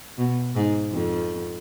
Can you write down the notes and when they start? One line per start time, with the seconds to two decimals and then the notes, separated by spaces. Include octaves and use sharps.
0.18 B2
0.55 G#2
0.93 F2